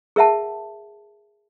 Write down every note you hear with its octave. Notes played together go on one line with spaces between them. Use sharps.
G#4 A#4 E5 F#5 A5